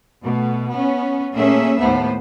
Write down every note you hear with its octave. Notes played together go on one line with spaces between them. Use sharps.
B2 A3
B3 C#4
A#2 A3 A#3 C#4 G#4 E5
D#2 A2 A3 B3 C5